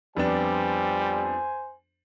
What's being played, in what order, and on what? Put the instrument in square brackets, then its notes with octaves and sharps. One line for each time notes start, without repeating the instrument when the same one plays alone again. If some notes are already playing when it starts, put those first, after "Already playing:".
[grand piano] F2 B3 D4 [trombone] G3 [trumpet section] C5 G#5